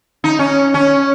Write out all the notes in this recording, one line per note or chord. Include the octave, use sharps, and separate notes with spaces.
D#4
C#4
C#4